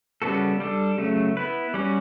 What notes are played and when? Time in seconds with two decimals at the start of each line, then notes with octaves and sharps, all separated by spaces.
0.22 C#3 G3 B3 F#4 A4
0.60 G3 D4 A4
0.98 C#3 F#3 A3
1.37 B3 E4 B4
1.74 G3 C#4 F#4